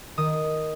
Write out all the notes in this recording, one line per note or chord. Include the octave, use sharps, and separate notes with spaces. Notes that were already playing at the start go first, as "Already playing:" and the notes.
D#3 D#6